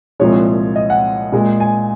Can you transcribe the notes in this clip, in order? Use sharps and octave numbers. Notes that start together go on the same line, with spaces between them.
C2 A#2 F3 G#3 C#5
D#5
F#5
A#2 G#3
G#5